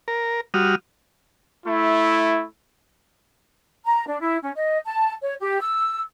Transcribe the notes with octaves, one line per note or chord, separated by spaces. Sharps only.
A#4
G3 F#4 D#6 F6
A3 E4
A#5
D4
E4
C#4
D#5
A5
C#5
G4
E6